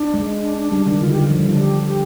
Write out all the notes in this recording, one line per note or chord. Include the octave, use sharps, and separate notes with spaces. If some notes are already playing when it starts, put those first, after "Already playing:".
Already playing: D4
G#3
D4
D4
G3 D4
D#3 D4
D3 F4
D3 G4
F4
F3
G3
D3 D4
G4
G4